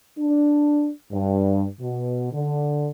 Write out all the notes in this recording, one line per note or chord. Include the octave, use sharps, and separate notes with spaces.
D4
G2
B2
D3